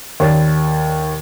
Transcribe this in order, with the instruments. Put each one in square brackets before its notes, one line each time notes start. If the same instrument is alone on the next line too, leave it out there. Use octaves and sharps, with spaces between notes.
[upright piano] D#2 C#5 D5 A6